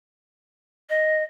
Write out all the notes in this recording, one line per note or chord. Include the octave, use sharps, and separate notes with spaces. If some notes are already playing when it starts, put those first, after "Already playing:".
D#5